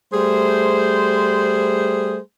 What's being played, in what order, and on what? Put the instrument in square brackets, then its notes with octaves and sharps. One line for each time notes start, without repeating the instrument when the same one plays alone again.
[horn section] G3 A3 G#4 C5